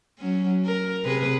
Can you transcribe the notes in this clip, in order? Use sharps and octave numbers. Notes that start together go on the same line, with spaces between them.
F#3 C#4
A#4
C3 G#4 B4